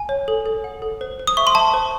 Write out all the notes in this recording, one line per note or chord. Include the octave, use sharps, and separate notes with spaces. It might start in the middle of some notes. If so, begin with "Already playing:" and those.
Already playing: G#5
C#5
A4
A4
F#5
A4
C5
C5
D#6
E5 C#6
C6
E5 A5
C5